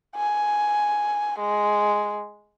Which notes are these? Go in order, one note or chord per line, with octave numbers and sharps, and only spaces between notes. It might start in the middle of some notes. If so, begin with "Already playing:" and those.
G#5
G#3